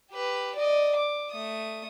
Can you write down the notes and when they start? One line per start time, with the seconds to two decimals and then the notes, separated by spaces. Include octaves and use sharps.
0.12 G4 B4
0.55 D5 D#5
0.95 D6
1.31 A3 D#6